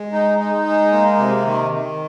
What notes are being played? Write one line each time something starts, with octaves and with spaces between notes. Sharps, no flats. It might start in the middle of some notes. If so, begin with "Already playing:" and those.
Already playing: G#3
D#4
D#4
G#3
A#3
C3
D#3
D#3